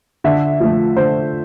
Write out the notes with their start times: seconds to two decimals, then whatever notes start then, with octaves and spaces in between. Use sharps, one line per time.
0.24 D3 E5
0.60 F3 A3
0.96 D3 C5